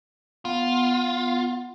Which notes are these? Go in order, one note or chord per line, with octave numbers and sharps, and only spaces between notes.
B3 F4 F#5